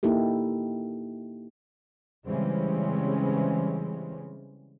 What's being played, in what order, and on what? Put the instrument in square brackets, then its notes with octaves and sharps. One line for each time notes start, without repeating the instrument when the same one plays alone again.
[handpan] A#3 D#4 E4 G4 A4
[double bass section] C#3 E3 G3 G#3 C4 C#4